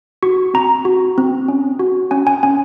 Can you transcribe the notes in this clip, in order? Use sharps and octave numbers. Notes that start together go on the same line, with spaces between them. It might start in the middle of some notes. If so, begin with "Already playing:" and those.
F#4 C#6
C4 A#5
F#4
C4
C#4
F#4
C#4 G#5
G#5
C#4 G#5